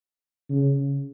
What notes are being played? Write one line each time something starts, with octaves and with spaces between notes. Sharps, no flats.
C#3